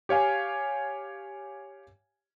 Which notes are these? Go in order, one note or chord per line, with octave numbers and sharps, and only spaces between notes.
G4 C#5 F5 G#5